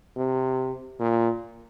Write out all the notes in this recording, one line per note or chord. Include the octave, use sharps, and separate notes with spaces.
C3
A#2